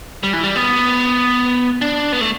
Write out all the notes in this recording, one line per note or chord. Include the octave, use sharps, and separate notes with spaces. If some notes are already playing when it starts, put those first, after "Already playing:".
G3
E3
G3
B3
D4
B3
A3